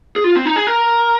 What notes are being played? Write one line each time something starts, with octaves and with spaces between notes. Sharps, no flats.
G#4
F4
C4
D#4
G#4
A#4